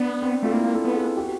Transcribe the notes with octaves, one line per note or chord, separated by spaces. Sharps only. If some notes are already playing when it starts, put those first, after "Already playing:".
Already playing: B3 D4
C4
A3 F4
A#3 E4
A4
B3
G#4
G4
F#4